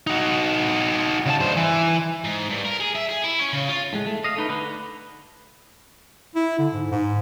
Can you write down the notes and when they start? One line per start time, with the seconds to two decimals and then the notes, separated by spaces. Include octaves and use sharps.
0.07 D#4 F#4
1.26 C#3 A5
1.40 G2 C5
1.57 E3
2.24 G#2
2.49 G2
2.65 A#4
2.80 G#4
2.95 E5
3.09 G#4
3.24 E4
3.39 C#4
3.53 C#3
3.69 F4
3.93 A2 G#3
4.07 A3
4.24 D#5 F5
4.37 A3 D#4 B4
4.49 D3 B4
6.36 E4
6.58 D3
6.73 G#2
6.91 G#2